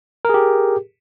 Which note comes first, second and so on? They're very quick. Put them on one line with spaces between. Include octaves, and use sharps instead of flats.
A#4 G#4 G4